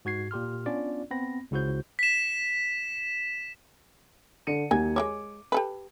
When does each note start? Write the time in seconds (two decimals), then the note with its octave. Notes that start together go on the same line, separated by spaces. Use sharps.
0.05 G#2 F#4 G#6 C7
0.31 A#2 G4 C6 F6
0.66 B3 C#4 D4 F4 D5
1.11 B3 C4 B5 A#6
1.51 C#2 C#3 E4 F#4 C5 G6
1.99 B6 E7
4.47 D3 C#7 D#7
4.71 D#2 F#3 G#5 G#6
4.96 G#3 B3 C#5 D6
5.52 G4 A4 B4